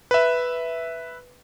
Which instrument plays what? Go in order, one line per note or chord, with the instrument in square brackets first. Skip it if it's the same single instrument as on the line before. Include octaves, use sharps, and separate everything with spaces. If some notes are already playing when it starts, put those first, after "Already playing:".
[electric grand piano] B4 E5